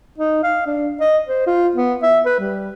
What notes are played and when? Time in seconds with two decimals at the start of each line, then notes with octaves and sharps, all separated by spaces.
0.18 D#4
0.43 F5
0.66 D4
1.00 D#5
1.28 C5
1.47 F4
1.75 B3
2.03 E5
2.25 B4
2.40 G3